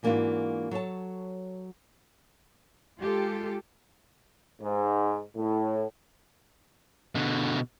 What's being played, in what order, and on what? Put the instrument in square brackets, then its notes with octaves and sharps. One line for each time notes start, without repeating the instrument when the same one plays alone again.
[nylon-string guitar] G#2 E3 A#3 D4 F4 F#4
F#3 A4 C#5 A5
[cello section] G#3 F4 G4 A4
[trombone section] G#2
A2
[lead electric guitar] B2 D3